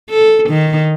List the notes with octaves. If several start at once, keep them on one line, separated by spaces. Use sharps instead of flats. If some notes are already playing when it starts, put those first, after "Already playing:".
A4
D#3